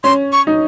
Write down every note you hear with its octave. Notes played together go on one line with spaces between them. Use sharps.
C#4 C6
C#6
D#4